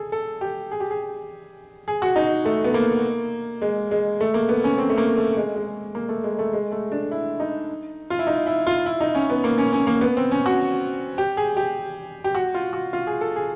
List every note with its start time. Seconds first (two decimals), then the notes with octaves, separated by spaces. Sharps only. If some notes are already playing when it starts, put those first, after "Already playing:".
Already playing: G#4 A4
0.12 A4
0.41 G4
0.71 G#4
0.80 G4
0.91 G#4
1.88 G#4
2.02 F#4
2.16 D#4
2.45 A3
2.64 B3
2.74 A#3
3.62 G#3
3.91 G#3
4.21 A3
4.34 A#3
4.49 B3
4.64 C#4
4.78 C4
4.90 A3
4.98 A#3
5.17 A3
5.37 G#3
5.56 G#3
5.95 A#3
6.09 A3
6.24 G#3
6.39 A3
6.53 G#3
6.72 A3
6.92 D4
7.11 E4
7.40 D#4
8.10 F4
8.19 E4
8.27 D#4
8.47 E4
8.67 F4
8.86 E4
9.01 D#4
9.15 C#4
9.30 B3
9.44 A#3
9.58 C#4
9.73 C#4
9.87 A#3
10.01 B3
10.17 C4
10.31 C#4
10.46 F#4
11.18 G4
11.37 G#4
11.57 G4
12.24 G4
12.35 F#4
12.54 F4
12.73 F#4
12.93 F4
13.07 G#4
13.21 A4
13.36 G#4